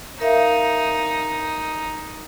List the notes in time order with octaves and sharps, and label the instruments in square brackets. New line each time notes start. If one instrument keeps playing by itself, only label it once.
[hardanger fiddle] D#4 [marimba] A#4 E5 F5